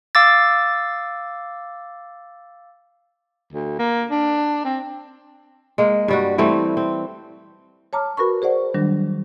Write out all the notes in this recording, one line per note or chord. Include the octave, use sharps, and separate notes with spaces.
F5 D6 E6 A6
D2
A#3
D4
C4
G#3 A#3
G2 G3 F#4
E3 G3 A3 C4
C4
C#5 A5 A#5 D6 F6
F#4 A#4 B4 B5 C#6
G#4 C5 D5 F#5
D#3 F#3 G3 D4